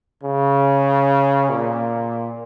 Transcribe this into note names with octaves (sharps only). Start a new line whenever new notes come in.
C#3
A#2